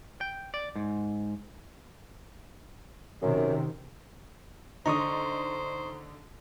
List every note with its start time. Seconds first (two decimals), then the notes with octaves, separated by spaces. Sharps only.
0.21 G5
0.54 D5
0.76 G#2
3.22 F#2 C3 D#3
4.86 D3 D4 D#4 C5 A#5 C#6 D#6